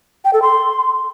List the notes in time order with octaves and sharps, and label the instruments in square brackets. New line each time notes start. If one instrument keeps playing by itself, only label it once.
[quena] G5
A4
C6